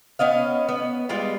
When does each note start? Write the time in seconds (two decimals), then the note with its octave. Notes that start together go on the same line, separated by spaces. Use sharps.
0.19 B3 C#4 D#5 F5
0.69 B3
1.09 G3 G#3 F4 G4